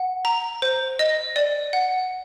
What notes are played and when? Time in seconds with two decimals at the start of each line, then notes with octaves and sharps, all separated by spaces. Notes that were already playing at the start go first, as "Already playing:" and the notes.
Already playing: F#5
0.25 A#5
0.62 C5
0.99 D#5
1.36 D5
1.73 F#5